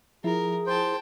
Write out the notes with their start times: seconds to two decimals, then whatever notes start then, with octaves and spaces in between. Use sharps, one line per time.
0.24 F3 E4 G#4 A#4
0.67 C5 G5 A5